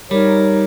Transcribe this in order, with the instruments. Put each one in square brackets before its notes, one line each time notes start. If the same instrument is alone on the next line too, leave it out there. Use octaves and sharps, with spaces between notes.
[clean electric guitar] G3 [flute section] D#4 A#4 C#5